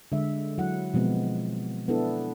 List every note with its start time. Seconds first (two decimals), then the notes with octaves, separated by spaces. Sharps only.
0.12 D3 G#3 E5
0.58 F#3 E4 F#5
0.94 B2 F3 G#3 B3 C4
1.88 B3 D4 E4 A4